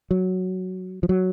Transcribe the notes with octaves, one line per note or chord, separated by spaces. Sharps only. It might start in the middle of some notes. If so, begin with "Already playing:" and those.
F#3
F3
F#3